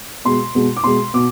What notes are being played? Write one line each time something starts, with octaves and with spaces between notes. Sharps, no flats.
B2 G#3 C6
B2 G#3
D6
B2 G#3 C6
B2 D6